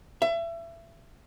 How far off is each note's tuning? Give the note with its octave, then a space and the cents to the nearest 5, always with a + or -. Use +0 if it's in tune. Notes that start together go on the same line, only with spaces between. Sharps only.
E5 +30